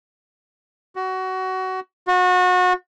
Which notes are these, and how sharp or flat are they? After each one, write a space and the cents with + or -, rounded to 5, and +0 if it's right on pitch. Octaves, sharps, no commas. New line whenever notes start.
F#4 +20
F#4 -30